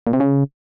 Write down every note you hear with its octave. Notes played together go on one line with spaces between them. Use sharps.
A#2
C3
C#3